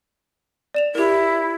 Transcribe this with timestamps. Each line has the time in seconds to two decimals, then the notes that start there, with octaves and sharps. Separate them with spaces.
0.74 D5 E7 F7
0.95 E4 G4 A#4